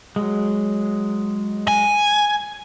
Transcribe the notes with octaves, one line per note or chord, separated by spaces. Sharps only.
F#3 G#3
G#5